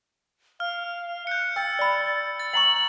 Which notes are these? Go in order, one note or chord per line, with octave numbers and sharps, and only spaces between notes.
F5 F6
F#6 G6 C#7
G5 E6 A6
D5 B5
A6
F#5 A#5 C#6 F#7